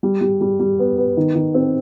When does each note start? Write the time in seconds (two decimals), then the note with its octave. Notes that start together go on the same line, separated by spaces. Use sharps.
0.03 G3
0.21 G3
0.41 G3
0.59 G3
0.79 B3
0.98 B3
1.17 D#3
1.35 D#3
1.54 C4